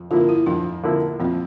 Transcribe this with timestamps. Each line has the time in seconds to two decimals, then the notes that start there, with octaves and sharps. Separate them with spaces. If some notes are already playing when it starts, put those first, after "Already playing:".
Already playing: F2
0.11 D3 F3 A#3 E4 F4
0.29 E4
0.46 F2 D4
0.83 D3 F3 A#3 E4
1.20 F2 C4